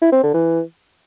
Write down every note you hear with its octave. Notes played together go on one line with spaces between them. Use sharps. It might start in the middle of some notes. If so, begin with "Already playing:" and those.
E4
C4
D3
E3